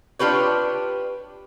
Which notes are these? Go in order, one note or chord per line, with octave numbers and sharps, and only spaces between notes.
D4 F4 G4 B4 C#5